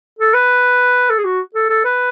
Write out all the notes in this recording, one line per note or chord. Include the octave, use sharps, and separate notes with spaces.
A4
B4
A4
G#4
F#4
A4
A4
B4